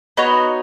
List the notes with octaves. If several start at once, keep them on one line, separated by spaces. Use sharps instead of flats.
B3 D#4 F#4 C#5